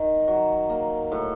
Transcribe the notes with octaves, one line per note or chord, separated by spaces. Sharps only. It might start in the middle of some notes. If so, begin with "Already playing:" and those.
Already playing: D#3 D#4
F#3
A#3
A2